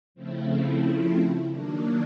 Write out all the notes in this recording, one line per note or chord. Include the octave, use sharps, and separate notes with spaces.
C#3 F3 A3 C4 E4
D#3 F#3 A#3 D4